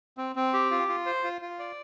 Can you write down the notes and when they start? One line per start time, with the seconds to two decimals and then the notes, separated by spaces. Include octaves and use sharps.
0.18 C4
0.36 C4
0.53 G4
0.71 F4
0.88 F4
1.06 C5
1.24 F4
1.41 F4
1.59 D5